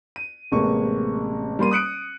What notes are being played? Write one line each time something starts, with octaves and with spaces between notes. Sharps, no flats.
D#7
A1 C3 G#3 A#3 C#6
G3 A#3 C6 D#7
D#6 F#6 C#7 D7